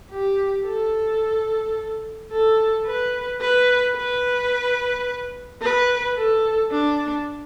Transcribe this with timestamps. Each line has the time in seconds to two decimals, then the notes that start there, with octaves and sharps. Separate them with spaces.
0.11 G4
0.66 A4
2.32 A4
2.86 B4
3.41 B4
3.96 B4
5.62 B4
6.17 A4
6.71 D4